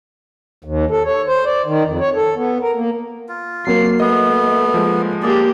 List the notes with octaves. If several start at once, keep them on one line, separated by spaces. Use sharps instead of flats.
D#2
A4
C#5
C5
D5
D#3
F2
C#5
A4
B3
A#4
A#3
F4
F#3 A#3 C7
A3 B3 D#5
F3 G#3
A#3 G4 G#4 D5